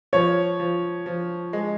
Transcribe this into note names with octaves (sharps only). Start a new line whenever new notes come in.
F3 C#5
F3
F3
G#3